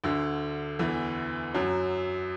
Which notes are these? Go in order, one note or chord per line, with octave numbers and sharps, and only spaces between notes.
D2 D3
E2 E3
F#2 F#3